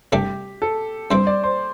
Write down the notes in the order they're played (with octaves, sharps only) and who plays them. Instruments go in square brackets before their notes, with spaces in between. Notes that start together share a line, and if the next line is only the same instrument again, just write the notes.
[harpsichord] C2 C3 A3 D4 [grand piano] G4
[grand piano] A4
[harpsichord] G2 G3 C4 E4 [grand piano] C5
[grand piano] D5
C5